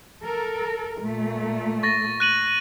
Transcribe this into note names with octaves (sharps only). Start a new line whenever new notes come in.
A4 A#4
A#2 A3
C#6 A6 A#6
F#6 D#7 F#7